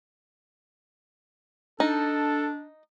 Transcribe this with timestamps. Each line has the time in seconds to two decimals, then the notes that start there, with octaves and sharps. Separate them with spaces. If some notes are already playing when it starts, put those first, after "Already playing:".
1.80 D4 D#4 A4